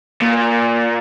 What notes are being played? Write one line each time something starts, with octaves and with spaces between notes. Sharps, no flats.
A#2